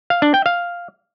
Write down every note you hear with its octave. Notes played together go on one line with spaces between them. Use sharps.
F5
D4
G5
F5